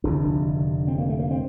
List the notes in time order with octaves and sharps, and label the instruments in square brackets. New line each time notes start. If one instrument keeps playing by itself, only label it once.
[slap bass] F1 D#2 D3 D4
C4
A#3
A3
A#3
C4